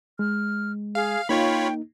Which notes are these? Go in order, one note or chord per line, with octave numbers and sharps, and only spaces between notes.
G#3 F6
G#4 F5
A#3 D#4 F4 C#5 G5 B5